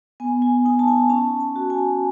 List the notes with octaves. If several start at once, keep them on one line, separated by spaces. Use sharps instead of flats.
B3 G#5
G#5
D#4 G#5
A5
G#5
C#4 A5
A5
F#4
G#5